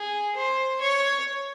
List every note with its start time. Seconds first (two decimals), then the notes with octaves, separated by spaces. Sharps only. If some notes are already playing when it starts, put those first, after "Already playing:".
Already playing: G#4
0.37 C5
0.81 C#5